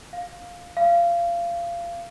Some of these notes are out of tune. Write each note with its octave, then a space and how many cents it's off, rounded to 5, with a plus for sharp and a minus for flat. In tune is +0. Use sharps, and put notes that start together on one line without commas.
F5 +15
F5 -25